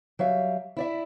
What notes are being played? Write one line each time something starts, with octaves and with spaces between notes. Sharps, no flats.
F#3 G3 E5 F5
E4 D5 E5